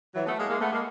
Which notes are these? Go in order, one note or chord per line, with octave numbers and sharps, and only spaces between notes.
E3 F#3
A3 B3
G#3 A#3
G#3 A#3
A3 B3
G#3 A#3